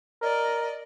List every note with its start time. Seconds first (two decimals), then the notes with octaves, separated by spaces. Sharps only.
0.22 A#4 D5 D#5